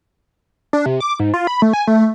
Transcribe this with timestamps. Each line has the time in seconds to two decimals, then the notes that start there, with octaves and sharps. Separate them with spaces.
0.73 D4
0.86 C3
1.00 D6
1.20 G#2
1.34 F4
1.47 B5
1.62 A3
1.73 G#5
1.87 A3